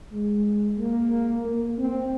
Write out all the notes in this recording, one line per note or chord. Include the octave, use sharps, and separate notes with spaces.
G#3
A#3
A#3
C4